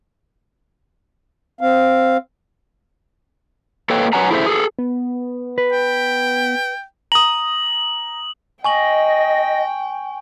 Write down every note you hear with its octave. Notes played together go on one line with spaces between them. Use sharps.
C4 F5
A#3 A4 B4 C#5 D#5 G5
F#3 B4 C#5 F#5 G#5 A#5
E4 G#4 A4 C5 E5
G#4 A4
B3
B4
G5
A#5 D#6 F#7
D#5 G5 G#5 C#6 F#7